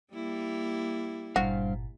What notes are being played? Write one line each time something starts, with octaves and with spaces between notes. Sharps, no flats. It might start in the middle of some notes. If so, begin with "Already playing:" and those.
G3 A#3 E4
G1 G2 A#2 F#4 C5 F5